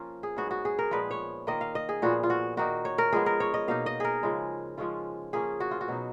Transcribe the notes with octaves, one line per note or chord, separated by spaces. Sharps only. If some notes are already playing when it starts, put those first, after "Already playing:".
Already playing: F3 A#3 C#4 F4
G#4
G#2 F#3 B3 F#4
F#4
G#4
A#4
A#2 F3 G#3 B3 B4
C#5
D#3 A#3 F4 D#5
F5
D#5
G#4
A#2 F3 B3 F4 F#4
F4
F#4
D#3 A#3 D#4 F#4
C#5
A#4
F3 G#3 B3 G#4
A#4
C#5
D#5
B2 A#3 D#4 F5
D#5
G#4 A#4
C#3 F3 G#3
F3 G#3 C#4 F4
F3 A#3 C#4 G#4
F#4
F4
F#4
B2 F#3 B3 D#4